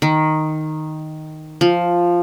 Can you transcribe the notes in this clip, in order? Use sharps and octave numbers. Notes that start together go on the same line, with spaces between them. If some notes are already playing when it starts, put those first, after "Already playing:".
D#3
F3